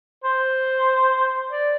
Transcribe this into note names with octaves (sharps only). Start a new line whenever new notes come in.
C5
D5